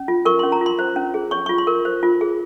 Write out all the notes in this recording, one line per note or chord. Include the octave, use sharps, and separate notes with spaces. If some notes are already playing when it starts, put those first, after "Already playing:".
Already playing: C#4
F4
A#4 C#6
C#4 C6
A#5
F4
C6
C5
C#4
G#4
C#5 C#6
F4 C#6
C6
A#4
C5
F4
G#4